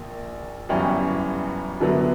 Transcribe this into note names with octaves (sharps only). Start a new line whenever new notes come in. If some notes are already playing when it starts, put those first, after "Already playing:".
Already playing: A#1 A#2 A#3
G1 F#2 E3 G3 C#4
F#2 D3 F#3 B3 E4